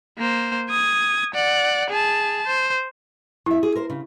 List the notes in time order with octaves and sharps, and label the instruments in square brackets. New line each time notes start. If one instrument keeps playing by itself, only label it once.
[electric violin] A#3 C5
D#6 G#6
D5 F#5
G#4 A5
C5
[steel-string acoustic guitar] F2 E5 [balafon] E4
[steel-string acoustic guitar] G#4
A#4 C5
C#3